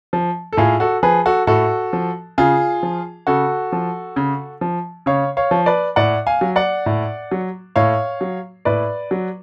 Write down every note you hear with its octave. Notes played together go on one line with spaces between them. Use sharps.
F3
A4
A2 F4 G#4
F#4 A4
F3 G#4 B4
F#4 A4
A2 F#4 A4
F3
C#3 F4 G#4
F3
C#3 F#4 A4
F3
C#3
F3
C#3 C#5 F5
C#5 F5
F3
B4 D5
A2 D5 F#5
F5 G#5
F#3
D5 F#5
A2
F#3
A2 C#5 F5
F#3
A2 B4 D5
F#3